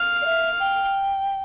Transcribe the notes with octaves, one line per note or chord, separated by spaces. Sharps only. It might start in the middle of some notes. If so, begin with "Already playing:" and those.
Already playing: F5
D5
E5
G5